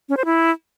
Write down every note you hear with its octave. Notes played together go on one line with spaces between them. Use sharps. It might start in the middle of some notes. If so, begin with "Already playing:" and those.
C#4
C5
E4